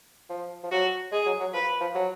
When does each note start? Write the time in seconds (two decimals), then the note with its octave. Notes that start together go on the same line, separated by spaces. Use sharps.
0.30 F3
0.64 F3
0.71 F#3 F#4
1.12 G#3 G#4
1.26 F#3
1.40 F#3
1.53 F3 B4
1.81 F3
1.95 F#3